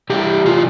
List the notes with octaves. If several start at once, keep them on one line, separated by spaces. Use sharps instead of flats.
C3 E3 G3 G4
F4